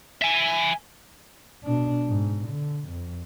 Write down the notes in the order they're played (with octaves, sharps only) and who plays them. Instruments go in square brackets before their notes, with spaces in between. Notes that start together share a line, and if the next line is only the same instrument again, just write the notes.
[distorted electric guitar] E5 G#5
[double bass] B2 D4
G#2
D3
F2